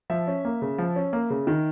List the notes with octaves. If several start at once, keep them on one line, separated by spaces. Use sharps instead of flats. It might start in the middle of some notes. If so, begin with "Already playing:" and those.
F3 E5
C#4
A#3
C#3
F3
C#4
A#3
C#3
D#3